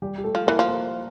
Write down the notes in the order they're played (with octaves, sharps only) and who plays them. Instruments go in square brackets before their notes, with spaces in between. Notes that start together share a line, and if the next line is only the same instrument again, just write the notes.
[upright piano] G3 G4
G4
A3 A4
[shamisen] F3
[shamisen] E3 [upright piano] A#3 A#4
[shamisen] F3
[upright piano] A#3 A#4